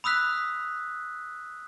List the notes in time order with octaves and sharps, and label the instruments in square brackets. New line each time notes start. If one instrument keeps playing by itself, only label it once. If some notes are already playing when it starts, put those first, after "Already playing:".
[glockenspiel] B5 D#6 E6 F#6 B6